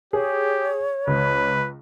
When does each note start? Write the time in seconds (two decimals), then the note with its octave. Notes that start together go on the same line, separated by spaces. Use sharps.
0.13 G4 G#4 C#5
1.07 C#2 B4